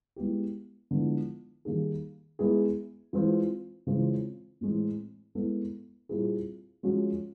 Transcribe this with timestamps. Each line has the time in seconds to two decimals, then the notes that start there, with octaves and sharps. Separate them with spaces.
0.16 G#3 B3 E4 G4
0.91 D3 F3 G#3 B3 E4
1.65 D#3 G3 A#3 D#4 G#4
2.39 G#3 B3 E4 G#4
3.13 E3 G#3 C4 F4
3.87 C#3 E3 G#3 C4 F4
4.61 A2 E3 G#3 C4
5.35 G#3 B3 E4 A4
6.09 A#2 G3 C4 E4 G#4
6.83 F3 G#3 C#4 F#4